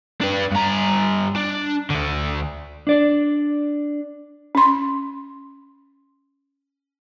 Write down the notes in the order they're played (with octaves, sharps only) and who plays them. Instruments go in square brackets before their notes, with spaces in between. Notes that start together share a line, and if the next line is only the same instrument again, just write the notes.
[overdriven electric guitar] D4 B4
G2 A#5
D4
D2 D3
[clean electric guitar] D4 D5
[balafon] C#4 C6